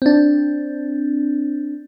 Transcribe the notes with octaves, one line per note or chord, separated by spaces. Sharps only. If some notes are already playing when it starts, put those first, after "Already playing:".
C4 D4